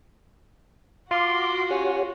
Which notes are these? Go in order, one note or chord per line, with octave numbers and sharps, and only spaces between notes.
F4 F#4 F5 C6 D6
C#4 G4 C#5 F#5